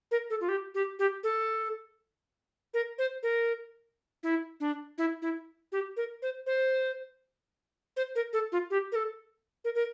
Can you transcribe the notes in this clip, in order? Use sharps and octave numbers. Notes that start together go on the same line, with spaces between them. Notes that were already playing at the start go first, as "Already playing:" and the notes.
A#4
A4
F4
G4
G4
G4
A4
A#4
C5
A#4
E4
D4
E4
E4
G4
A#4
C5
C5
C5
A#4
A4
F4
G4
A#4
A4
A#4
A#4